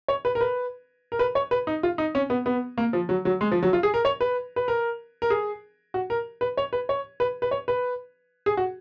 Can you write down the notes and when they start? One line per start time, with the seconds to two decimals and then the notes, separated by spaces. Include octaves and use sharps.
0.08 C#5
0.25 B4
0.35 A#4
0.41 B4
1.12 A#4
1.19 B4
1.35 C#5
1.51 B4
1.67 D#4
1.83 F4
1.98 D#4
2.15 C#4
2.30 B3
2.46 B3
2.78 A#3
2.93 F3
3.09 F#3
3.25 F#3
3.41 G#3
3.52 F3
3.63 F#3
3.73 F4
3.83 G#4
3.94 A#4
4.05 C#5
4.21 B4
4.56 B4
4.68 A#4
5.22 A#4
5.30 G#4
5.94 F#4
6.10 A#4
6.41 B4
6.57 C#5
6.73 B4
6.89 C#5
7.20 B4
7.42 B4
7.51 C#5
7.68 B4
8.46 G#4
8.57 F#4